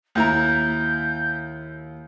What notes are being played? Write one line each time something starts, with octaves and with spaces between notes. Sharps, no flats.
D#2 E4 A#5 G6